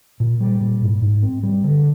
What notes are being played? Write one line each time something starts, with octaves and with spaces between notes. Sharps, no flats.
A#2
G3
A#2
G#2
G#2
C4
G3
D3